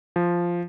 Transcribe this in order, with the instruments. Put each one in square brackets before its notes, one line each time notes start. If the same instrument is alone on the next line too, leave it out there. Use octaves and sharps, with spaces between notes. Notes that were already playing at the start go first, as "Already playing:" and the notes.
[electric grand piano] F3